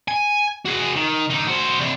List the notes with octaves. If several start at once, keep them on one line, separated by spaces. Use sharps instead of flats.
G#5
F#4 G#4
D#3
D3 D#4
F#4 C5
C3 D4